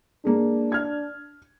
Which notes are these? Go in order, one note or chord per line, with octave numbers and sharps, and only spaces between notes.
G#3 A#3 D4
F6 G#6